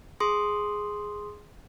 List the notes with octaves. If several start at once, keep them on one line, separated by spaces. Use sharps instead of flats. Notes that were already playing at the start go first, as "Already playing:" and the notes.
G#4 C6 D#6